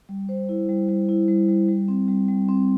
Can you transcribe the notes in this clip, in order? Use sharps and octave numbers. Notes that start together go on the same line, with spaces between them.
G3
C5
E4
G3
G3
E4
G3
G3
G3
C4
G3
G3
C4